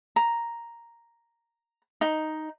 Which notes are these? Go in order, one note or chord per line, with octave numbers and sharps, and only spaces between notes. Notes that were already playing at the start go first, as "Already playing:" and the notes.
A#5
D#4